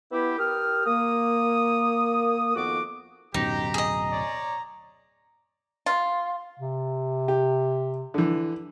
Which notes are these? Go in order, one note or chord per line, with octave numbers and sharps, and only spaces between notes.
B3 E4 G4
G4 A#4 G5 D#6 F6
A#3 D#6
F2 D#3 B3 F#4 D6
D1 F#2 B2 C4 D#4 G4 A#5
G#4 D#5
C#5 D5
F4
C3
G4
D3 E3